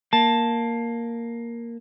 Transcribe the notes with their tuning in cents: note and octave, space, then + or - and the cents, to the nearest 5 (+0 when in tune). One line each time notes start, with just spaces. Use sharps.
A#3 +0 A5 +0